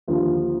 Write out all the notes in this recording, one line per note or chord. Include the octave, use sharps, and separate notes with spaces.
D#2 D3 F3